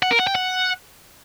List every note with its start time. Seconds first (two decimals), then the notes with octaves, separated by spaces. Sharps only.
0.03 F#5
0.11 A#4
0.19 F#5
0.27 G5
0.35 F#5